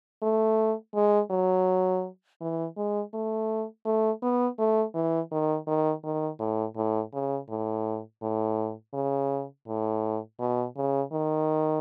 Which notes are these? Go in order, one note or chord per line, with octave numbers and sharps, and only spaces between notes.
A3
G#3
F#3
E3
G#3
A3
A3
B3
A3
E3
D#3
D#3
D#3
A2
A2
C#3
A2
A2
C#3
A2
B2
C#3
D#3